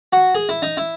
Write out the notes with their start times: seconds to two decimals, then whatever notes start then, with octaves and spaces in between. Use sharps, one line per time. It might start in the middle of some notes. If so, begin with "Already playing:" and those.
0.13 F#4
0.35 G#4
0.49 E4
0.62 D#4
0.77 E4